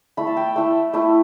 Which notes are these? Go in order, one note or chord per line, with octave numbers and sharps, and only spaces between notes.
A3 E4 B5
A5
G5
A3 E4
A3 E4